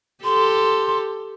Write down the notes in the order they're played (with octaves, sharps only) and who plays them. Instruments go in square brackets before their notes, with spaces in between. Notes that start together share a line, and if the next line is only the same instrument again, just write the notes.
[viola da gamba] G4 A4 [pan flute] C6